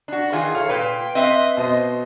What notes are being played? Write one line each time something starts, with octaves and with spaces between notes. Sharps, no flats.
D4 F#4
D#3 E3 F4 G#4
A4 C#5 F5
A#2 B4 G5
C4 B4 D#5 E5
B2 C5 D#5